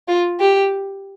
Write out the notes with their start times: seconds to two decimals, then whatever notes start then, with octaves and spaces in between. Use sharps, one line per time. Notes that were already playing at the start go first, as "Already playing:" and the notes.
0.08 F4
0.40 G4